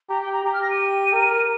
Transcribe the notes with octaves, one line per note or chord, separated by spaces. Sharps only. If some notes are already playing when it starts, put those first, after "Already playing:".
G4 A#5
G5
A#5
G4 A#5
F6
A#6
D#7
A#4